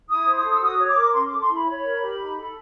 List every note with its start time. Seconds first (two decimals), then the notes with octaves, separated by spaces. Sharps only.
0.09 E4 D#6
0.25 C5
0.34 D#6
0.44 A4
0.51 E6
0.60 F#4 D#6
0.78 C#5
0.87 D6
0.96 A#4
1.13 C#4 C6
1.26 D6
1.31 A4
1.40 C6
1.48 E4
1.53 B5
1.66 C#5 B5
1.84 A#4
2.01 G4
2.18 D#4
2.36 A4